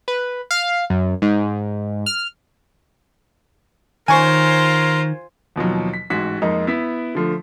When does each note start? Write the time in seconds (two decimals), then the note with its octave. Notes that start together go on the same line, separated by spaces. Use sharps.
0.08 B4
0.51 F5
0.90 F#2
1.22 G#2
2.06 F6
4.08 D#3 D#4 F4 A#4 C5 C#5 G#5 C#6
5.56 D#2 B2 F3 F#3
5.93 B6
6.10 A1 G#2 F#4 B6
6.42 F2 G#3 A#3 D#4
6.67 B3 E4 B6
7.15 D3 F3 A3